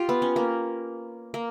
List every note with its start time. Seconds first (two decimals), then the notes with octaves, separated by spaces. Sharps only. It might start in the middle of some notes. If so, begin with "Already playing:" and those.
Already playing: F4 G4
0.09 B3
0.22 C#4
0.36 A#3
1.34 A#3